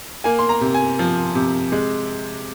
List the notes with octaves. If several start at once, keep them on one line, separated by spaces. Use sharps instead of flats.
A#3 G#5
C6
A#5
C3
G#5
F3
C3
G#3